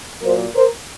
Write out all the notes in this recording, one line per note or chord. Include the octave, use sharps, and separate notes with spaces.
A#2 F#3 A#3 A#4 C5
A#4 C5